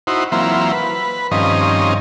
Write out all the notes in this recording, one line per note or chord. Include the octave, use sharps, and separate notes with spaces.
D#4 E4 F#4 C5
E3 F#3 A#3 C4 E4 F4
B4
G2 D#3 F3 C4 C#4 D#5